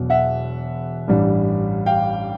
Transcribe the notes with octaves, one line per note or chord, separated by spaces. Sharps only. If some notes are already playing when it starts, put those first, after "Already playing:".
Already playing: E1 E2 B2 F#3
E5 F#5
A1 G2 E3 G3
F5 G5